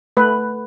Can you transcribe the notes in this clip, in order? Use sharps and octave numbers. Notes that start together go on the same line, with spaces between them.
A3 B4